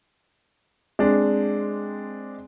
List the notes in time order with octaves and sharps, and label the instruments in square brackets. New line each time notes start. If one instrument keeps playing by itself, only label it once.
[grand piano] G#3 C4 D4